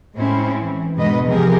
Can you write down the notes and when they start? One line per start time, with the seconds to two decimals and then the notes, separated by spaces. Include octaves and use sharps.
0.14 A2 G#3 C4 C#4 E4
0.60 E3
0.97 E2 G#2 B2 D3 B4 D#5
1.27 C3 F3 G4 G#4 A#4